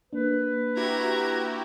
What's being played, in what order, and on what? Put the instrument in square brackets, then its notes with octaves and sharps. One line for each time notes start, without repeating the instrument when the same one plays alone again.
[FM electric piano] A#3 D4 [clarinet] B4
[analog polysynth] E4 F#4 G4 [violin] A#5 G#6